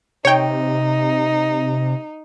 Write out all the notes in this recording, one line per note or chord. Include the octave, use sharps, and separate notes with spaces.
C3 D#4 C#5 G5